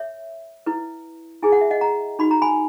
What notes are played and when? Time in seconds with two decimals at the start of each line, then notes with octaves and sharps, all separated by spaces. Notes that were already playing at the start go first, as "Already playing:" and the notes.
Already playing: C#5 E5
0.66 E4 B4
1.42 E4 G#4 B4 G#5
1.52 F#5
1.61 E5
1.71 D#5 F#5
1.81 F#5 A#5
2.19 D#4 F#4 B4 B5
2.31 A#5
2.42 G#5 B5